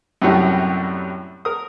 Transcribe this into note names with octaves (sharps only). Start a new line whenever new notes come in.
F#2 A2 C3 F#3 G3
A#4 D#6